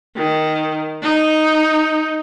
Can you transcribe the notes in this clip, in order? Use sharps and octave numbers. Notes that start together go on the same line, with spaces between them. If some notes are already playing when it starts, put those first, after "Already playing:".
D#3
D#4